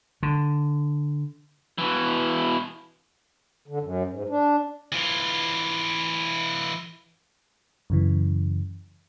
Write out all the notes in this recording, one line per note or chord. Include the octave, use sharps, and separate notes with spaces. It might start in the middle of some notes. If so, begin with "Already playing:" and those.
D3
B2 E3
D3
F#2
G#2
D4
E3 F4
F#2 C#3 E3